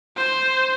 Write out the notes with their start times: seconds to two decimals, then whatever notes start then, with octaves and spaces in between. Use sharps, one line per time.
0.17 C5